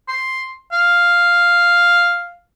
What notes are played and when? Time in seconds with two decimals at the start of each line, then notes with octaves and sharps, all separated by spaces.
0.09 C6
0.72 F5